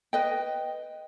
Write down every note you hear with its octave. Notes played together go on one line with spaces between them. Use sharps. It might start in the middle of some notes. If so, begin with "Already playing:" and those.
B4 D#5 G5